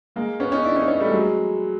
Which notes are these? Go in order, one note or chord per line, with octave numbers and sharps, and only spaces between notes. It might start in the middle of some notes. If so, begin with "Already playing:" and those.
G#3 A#3
B3 C#4
C#4 D#4
D4 E4
C#4 D#4
B3 C#4
G3 A3
F#3 G#3